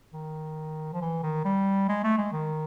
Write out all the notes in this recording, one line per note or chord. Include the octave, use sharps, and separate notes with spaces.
D#3
F3
E3
D#3
G3
G#3
A3
G#3
D#3